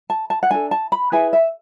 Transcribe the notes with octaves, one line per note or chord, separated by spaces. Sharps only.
A5
A5
F#5
D4 A4 G#5
A5
B5
E4 G#4 B4 G#5
E5